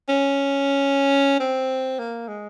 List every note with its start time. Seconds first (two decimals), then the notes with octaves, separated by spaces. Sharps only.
0.09 C#4
1.40 C4
1.99 A#3
2.28 G#3